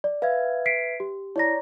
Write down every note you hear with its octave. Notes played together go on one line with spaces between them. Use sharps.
D5
B4 E5 F5 G#6
B6 C7 D7
G4
E4 C#5 D5 A#5 A#6